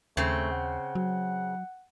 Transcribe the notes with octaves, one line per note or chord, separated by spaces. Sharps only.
D#2 C#3 A3 C4
F#5
F#3